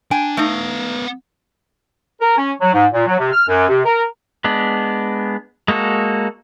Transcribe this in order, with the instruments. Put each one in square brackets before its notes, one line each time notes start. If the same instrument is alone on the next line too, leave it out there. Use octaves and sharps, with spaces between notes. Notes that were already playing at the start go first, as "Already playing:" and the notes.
[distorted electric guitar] D4 [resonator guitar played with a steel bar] G5 G#5
[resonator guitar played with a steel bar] A3 D#4 [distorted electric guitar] B3 F5
[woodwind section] A#4
C#4
F#3
G#2
A#2
F#3
C3
F6
F#2
C3
A#4
[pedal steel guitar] G#3 B3 D4
G#3 A#3 F#4 A4